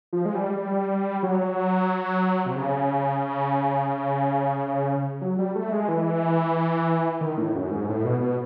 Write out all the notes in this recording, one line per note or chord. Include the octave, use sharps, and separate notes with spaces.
F3
G#3
G3
G3
F#3
C3
C#3
F#3
G3
A3
G#3
E3
D#3
A2
F#2
G#2
A2
B2
B2